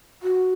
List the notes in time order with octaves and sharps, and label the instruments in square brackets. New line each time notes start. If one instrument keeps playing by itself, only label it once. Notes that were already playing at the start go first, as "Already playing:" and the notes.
[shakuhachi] F#4